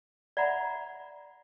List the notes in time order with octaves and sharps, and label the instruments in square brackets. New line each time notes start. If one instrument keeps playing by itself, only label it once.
[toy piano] D5 E5 F#5 A#5 B5